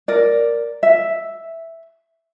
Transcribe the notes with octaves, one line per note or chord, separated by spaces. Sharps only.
A#4 D5
E5